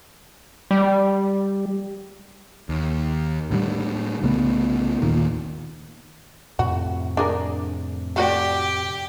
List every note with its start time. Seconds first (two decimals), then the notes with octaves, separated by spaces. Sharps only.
0.71 G3
2.69 D#2
3.50 A2 D3 G3
4.22 C2 C#3 A3 B3
5.02 A1 D#2 A#2 D#3
6.59 F2 A2 C3 F#4
7.17 D4 G#4 A#4
8.16 A3 F#4 G4 D5